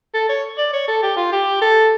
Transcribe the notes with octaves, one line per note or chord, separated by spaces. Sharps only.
A4
C#5
D5
C#5
A4
G4
F4
G4
A4